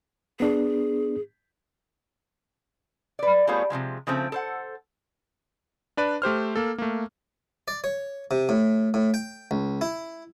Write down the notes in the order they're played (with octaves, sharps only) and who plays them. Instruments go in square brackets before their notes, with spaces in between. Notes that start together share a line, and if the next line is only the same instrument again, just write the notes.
[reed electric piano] B3 D4 [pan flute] G#4
[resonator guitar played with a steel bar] B4 D5
G3 A3 B3 F4 G#4 C#5
C3 D#3 F3 G#3
C#3 F3 A3 C4
A4 C5 F#5
[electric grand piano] D4 B4 D5
A3 G4 C5 F6
A#3 A4
A3 A#3
[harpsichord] D5
C#5
C3
A2
A2
G5
C#2
E4